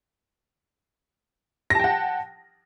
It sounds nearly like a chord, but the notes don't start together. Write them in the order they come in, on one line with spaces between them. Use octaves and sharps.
A#6 A5 G5 F#5